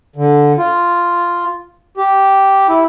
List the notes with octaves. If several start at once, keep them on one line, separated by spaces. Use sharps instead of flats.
D3
F4
G4
E4